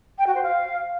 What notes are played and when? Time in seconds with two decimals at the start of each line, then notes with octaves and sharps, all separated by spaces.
0.18 G5
0.27 F#4
0.35 C5
0.43 F5